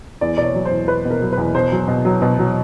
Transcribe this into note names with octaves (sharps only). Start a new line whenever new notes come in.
E2 D5
B2 D5
C#5
F#3
C5
E2
E2 B4
B2
A#4
F#3
B4
E2
B2 C5
F#3
B2
F#3
B2
F#3